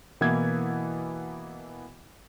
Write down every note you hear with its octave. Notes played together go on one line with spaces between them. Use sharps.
B2 E3 A#3 B3 E4 G#6